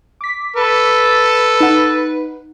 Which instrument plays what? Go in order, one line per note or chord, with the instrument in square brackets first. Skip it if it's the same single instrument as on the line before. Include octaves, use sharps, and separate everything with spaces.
[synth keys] D6 B6
[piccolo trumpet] A4 [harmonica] B4
[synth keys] D#4 F#5